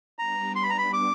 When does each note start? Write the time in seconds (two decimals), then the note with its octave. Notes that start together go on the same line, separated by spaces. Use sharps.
0.18 G3 B3 D4 A#5
0.56 C6
0.63 B5
0.70 A#5
0.78 B5
0.93 D6